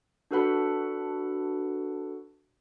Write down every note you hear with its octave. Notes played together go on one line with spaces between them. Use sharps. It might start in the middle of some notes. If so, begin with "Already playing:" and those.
D4 F#4 A4 B4 F#5 B5